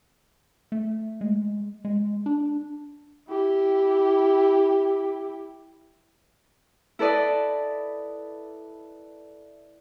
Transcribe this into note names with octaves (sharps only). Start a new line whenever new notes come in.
A3
G#3
G#3
D4
E4 G4
E4 A4 B4 D5 D#5